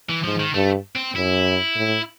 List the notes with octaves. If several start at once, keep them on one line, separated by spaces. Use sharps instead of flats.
E3
G#2 F3
D#3
G2 A3
C4
F#2 E4
A2